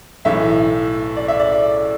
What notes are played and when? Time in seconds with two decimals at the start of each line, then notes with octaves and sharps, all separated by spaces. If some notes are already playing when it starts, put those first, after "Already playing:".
0.25 B1 A2 E3 E5
1.17 D5
1.28 E5
1.40 D5